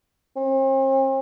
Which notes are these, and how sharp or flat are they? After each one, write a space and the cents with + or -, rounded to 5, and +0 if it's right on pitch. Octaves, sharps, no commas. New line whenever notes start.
C4 +45